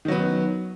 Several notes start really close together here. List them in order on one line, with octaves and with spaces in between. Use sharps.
D#3 F#3 B3